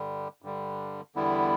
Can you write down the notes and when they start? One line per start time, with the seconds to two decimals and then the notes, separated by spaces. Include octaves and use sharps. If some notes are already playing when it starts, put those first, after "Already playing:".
Already playing: G2 D3 G3
0.42 G2 D3 G3
1.15 E2 D3 G3 B3 E4